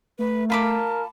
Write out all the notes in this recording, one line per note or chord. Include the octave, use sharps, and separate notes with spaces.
A3 B4
F4 A#4 A5 B5 D6